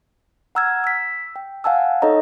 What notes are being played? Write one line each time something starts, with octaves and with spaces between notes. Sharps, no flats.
F#5 A#5 E6 F6 G#6
E6 B6
G5
F5 F#5 G#5 A5 E6
D#4 A4 C#5 D#5 A#5